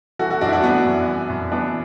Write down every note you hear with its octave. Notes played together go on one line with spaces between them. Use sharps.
E3 F#4 A4
F#4 A4
F#2 D4 F#4
E4
D4 F#4
E3 B3 D4
F#2
E3
F#2
E3 B3 D4